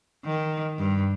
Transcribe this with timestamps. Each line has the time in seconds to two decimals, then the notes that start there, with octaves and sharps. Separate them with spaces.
0.25 D#3
0.78 G2